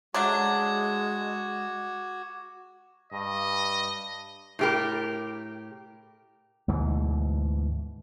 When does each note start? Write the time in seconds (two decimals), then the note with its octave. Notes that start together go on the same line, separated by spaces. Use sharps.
0.14 F#3 G#3 A3 D4 F#4 D6 G#6
3.12 G2 D#5
4.59 A2 G4 A#4
6.68 D2 G#2 B2 E3